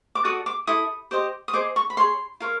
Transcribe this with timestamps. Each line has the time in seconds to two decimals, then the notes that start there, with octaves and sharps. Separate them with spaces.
0.15 D6
0.24 F#4 A4 D5 D#6
0.46 D6
0.67 E4 A4 D#6
1.11 G4 C5 D#5
1.48 D#6
1.53 G#4 C5 D#5 D6
1.76 C#6
1.90 B5
1.97 G#4 C#5 C6
2.40 F4 A#4 C#5